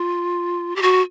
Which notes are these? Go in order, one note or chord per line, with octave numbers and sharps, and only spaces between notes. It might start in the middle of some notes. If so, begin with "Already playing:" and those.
Already playing: F4
G4
F#4